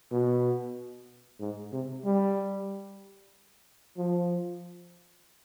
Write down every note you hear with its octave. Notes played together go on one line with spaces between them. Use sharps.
B2
G#2
C3
G3
F3